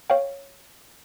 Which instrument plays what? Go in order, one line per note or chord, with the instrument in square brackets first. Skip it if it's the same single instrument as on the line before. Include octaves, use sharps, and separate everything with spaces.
[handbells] C#5 F5 G5